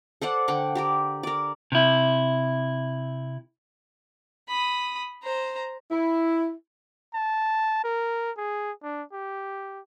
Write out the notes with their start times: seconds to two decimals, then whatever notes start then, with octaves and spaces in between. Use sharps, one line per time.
0.21 A4 C5 D5 F#5
0.48 D3 F#5 G5 D6
0.75 G4 A#4 D5
1.23 A#4 D5
1.72 C3 E4
4.48 B5 D#6
5.23 C5 A#5
5.91 E4
7.14 A5
7.84 A#4
8.38 G#4
8.83 D4
9.13 G4